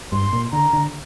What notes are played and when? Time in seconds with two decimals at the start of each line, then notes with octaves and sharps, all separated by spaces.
0.12 G2 C6
0.33 A#2
0.52 D3 A#5
0.73 D3